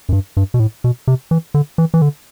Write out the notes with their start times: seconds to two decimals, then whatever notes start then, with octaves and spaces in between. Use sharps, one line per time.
0.09 F#2
0.13 G2
0.37 G2
0.54 B2
0.60 A2
0.84 B2
1.07 C3
1.31 E3
1.54 D3
1.78 E3
1.94 E3
2.02 D3